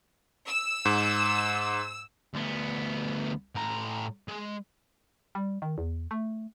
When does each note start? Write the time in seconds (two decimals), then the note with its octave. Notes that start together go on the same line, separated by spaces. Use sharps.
0.46 E6
0.85 G#2
2.34 D2 B3
3.55 A2 A#5
4.28 G#3
5.35 G3
5.62 D#3
5.78 E2
6.11 A3